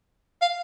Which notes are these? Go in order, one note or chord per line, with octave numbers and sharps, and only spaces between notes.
F5